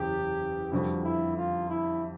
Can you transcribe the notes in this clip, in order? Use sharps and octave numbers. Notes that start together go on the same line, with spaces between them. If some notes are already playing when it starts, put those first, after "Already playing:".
Already playing: F#1 E2 C#3 G4
F2 D3 G3 F#4
E4
F4
E4